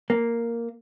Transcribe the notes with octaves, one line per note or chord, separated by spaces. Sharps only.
A#3